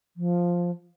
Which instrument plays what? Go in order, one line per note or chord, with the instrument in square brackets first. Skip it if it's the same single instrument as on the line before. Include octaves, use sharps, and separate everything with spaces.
[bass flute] F3